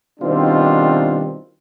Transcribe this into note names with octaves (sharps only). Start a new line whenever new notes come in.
B2 D#3 G3 C4 D4 F4